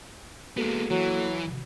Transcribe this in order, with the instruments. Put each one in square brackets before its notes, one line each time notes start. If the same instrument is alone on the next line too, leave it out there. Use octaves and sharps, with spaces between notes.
[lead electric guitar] G#3 B3 [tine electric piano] A#3 F#4 A4
[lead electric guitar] E3 [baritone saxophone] F#3
[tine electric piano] G#1 C3